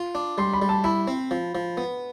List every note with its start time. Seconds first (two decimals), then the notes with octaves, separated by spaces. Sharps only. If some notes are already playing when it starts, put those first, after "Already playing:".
Already playing: F4
0.15 D4
0.38 G3 C6
0.54 B5
0.62 G3
0.69 A5
0.84 E4 B5
1.07 C4
1.31 F3
1.55 F3
1.77 B3